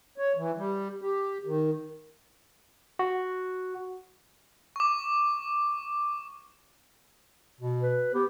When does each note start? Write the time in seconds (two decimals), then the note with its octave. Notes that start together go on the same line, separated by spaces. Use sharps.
0.18 C#5
0.36 E3
0.57 G3
1.01 G4
1.45 D#3
2.99 F#4
4.76 C#6 D6
7.60 B2
7.82 B4
8.14 B3 G4